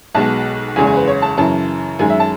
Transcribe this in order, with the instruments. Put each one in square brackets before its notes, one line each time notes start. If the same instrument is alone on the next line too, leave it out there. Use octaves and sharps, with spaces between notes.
[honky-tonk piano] B1 B2 G#3 A5
F#1 E2 C#3 G#3 G#5
G#5
B4
C#5
A5
F#2 C#3 E3 A5
F#2 D#3 G#3 G#5
E5
A5